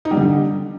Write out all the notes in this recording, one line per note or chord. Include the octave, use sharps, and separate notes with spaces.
D#4
G3
D3